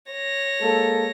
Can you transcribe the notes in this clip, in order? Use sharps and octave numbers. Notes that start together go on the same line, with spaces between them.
C#5 A#6
G#3 A#3 A4